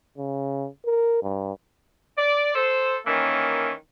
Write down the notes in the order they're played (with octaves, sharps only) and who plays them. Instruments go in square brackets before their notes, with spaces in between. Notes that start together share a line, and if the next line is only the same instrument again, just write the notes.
[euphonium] C#3
A#4
G2
[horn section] D5
A4 C5
D#3 E3 A#3 C#4